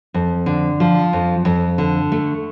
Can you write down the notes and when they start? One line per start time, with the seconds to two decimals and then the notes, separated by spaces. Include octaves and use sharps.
0.14 F2
0.46 D3
0.80 F3
1.13 F2
1.45 F2
1.78 D3
2.12 A3